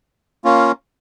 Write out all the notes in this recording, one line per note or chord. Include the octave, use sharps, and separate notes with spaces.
A#3 C#4 F4